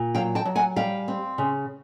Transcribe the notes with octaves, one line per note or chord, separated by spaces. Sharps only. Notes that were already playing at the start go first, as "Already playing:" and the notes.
Already playing: A#2
F#3 F5 G5
G5 A5
F#3
F#5 G#5
G3 F5 G5
C4
C#3